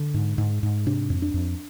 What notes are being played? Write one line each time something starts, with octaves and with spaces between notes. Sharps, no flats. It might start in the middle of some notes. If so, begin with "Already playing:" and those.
Already playing: D3
G#2
G#2
G#2
C3 D4
F2
D4
F2